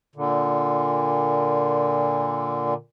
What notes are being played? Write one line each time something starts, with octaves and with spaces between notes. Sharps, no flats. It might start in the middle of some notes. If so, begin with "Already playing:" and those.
A#2 D3